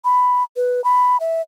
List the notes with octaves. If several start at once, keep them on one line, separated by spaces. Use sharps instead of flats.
B5
B4
B5
E5